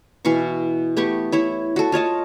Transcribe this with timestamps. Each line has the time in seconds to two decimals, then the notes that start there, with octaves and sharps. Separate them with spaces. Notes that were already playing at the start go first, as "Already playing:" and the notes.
0.25 B2 E3 F5 C#6
0.97 A3 B3 G4 C#6
1.32 E4 C#5 E5
1.76 F#4 A4
1.92 F4 C#5 D#5 A5